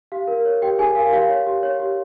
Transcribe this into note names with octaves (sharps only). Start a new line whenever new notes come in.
G4 F5
A#4
C#5
G4 G5
G4 G#4 G#5
A#4 F5
G4 F5
C#5
G4
C#5
G4